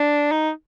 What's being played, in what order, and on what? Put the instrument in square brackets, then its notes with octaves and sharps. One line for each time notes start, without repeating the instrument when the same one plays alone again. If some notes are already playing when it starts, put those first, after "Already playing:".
Already playing: [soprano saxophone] D4
D#4